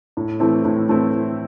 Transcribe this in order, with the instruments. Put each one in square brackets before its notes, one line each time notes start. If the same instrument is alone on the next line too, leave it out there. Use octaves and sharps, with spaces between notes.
[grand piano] A2
E3 A3 C4 E4
A2
E3 A3 C4 E4